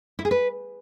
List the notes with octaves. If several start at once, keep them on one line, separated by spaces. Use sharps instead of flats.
E4
G#4
B4